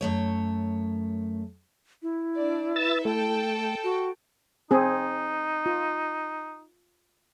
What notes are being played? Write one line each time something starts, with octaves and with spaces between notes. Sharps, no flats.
F#2 A3 C#5
E4
D4 D5
B4 E5 E6 A6
A3 A4 G5 A5
F#4
C4 D#4 G#4
F4